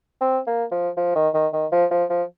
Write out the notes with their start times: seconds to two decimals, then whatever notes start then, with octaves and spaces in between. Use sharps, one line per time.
0.21 C4
0.47 A#3
0.72 F3
0.97 F3
1.16 D#3
1.34 D#3
1.53 D#3
1.72 F3
1.91 F3
2.10 F3